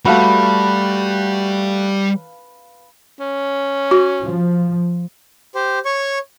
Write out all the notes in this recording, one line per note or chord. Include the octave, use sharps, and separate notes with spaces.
G3 A3 F#4 B4 F5 A5
C#4
F#4
F3
G4 C5
C#5 C#6